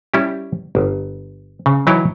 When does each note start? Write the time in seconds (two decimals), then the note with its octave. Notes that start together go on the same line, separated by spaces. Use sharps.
0.14 G3 C#4 E4 G4
0.75 G1
1.66 C#3
1.87 E3 F#3 D#4 E4 C#5 G5